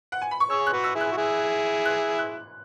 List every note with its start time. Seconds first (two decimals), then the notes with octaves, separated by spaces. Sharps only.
0.12 F#5
0.22 G#5
0.31 B5
0.40 C#6
0.50 G#4 C#5 E6
0.67 F#6
0.73 F#4 B4
0.84 E6
0.95 E4 G#4
1.01 F#6
1.12 F#4
1.17 E4 G#4
1.85 F#6
2.19 F#6